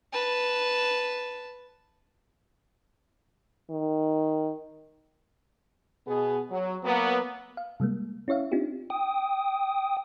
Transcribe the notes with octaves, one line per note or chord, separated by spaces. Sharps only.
B4 A5
D#3
B2 B3 G#4
F#3
F#3 A#3 B3
F5
C3 G3 G#3 A#3
C#4 E4 C#5 E5 F5
C4 D4 D#4 F4 G4
G5 D#6